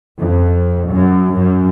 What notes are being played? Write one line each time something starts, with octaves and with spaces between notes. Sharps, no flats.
F2
F#2
F#2